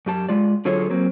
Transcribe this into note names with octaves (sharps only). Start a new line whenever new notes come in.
F#2 G4 A5
G#3 F4 D5
D3 F#3 F4 G#4 A4 C#5
F#3 A#3 C4